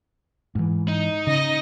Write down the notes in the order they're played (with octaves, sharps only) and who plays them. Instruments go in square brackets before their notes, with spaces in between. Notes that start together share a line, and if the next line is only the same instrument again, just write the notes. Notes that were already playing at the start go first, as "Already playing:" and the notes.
[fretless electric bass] G#2 E3
[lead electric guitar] D#4
[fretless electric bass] C#3 [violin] D#5 A#6